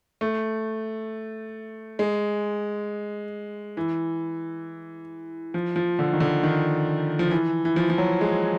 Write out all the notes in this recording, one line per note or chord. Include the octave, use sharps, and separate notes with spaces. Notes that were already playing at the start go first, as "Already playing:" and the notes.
A3
G#3
E3
F3
F3
D3
D#3
D3
D#3
F3
E3
E3
F3
F3
F#3
G#3